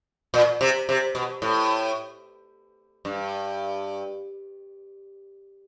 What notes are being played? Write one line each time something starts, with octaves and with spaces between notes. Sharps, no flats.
A#2
C3
C3
B2
A2
G2